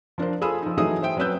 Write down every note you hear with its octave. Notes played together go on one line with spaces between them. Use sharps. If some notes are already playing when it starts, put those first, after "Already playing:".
F3 D4 A#4 C5
F4 G#4 A4 B5 D#6 E6
F3 D#4
E3 F#3 A3 D#4 G#4 D#6
C5 E5 G5
F#3 C4 C#4 B4 E6 G6